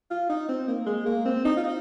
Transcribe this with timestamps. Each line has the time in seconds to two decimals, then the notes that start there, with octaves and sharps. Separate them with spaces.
0.11 F4
0.30 D#4
0.49 C4
0.68 A#3
0.86 G#3
1.06 A#3
1.25 C4
1.45 D#4
1.57 F4
1.64 D#4